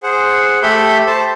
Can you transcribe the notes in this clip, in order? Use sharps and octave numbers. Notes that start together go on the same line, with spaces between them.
G#4 C5 F#5
A3 G4 A4 E5 B5 G6
C5 A5